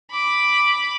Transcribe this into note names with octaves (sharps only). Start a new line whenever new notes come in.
B5 D6